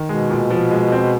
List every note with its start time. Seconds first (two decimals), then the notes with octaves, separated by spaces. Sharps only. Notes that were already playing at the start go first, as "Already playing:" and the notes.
Already playing: D#3
0.09 B2 G#3
0.30 A#2
0.50 F3
0.71 G#3
0.92 C4